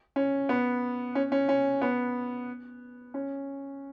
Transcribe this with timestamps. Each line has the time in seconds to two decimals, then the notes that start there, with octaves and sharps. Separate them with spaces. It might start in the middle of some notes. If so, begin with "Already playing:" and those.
0.16 C#4
0.49 B3
1.15 C#4
1.32 C#4
1.49 C#4
1.82 B3
3.14 C#4